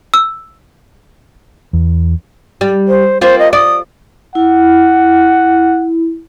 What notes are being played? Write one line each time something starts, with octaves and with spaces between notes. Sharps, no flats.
E6
E2
G3
C5
A#3 C4 F4 C5
D#5
D5 D#6
E4 F#5